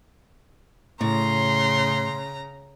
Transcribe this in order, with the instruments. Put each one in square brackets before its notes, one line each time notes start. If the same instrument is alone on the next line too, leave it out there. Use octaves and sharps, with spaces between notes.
[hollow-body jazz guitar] A2 [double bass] C#3 [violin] A#5 [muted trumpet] C6